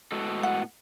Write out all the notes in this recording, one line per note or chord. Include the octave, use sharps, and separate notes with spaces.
A2 G#3 B3 F#4 A4
F#5